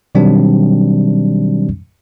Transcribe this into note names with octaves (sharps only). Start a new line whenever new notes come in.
B2 D#3 F#3 G3 C4 D4